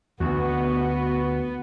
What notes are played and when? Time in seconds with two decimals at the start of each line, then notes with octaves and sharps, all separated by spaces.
0.20 D2 B3 F#4